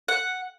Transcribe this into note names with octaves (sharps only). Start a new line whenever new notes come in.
F#5